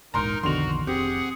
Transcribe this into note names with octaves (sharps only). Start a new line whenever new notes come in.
E1 A#1 G#2 D#4 A#4 A#5 C6 F6
B1 F2 B2 D3 D#3 F#4 C6 F7
F1 C4 G4 G#4 F#5